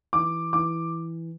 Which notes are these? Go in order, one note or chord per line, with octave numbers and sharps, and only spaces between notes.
E3 D6
E3 D6